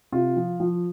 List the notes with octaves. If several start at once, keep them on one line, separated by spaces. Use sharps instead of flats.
C3 F4
F3
F3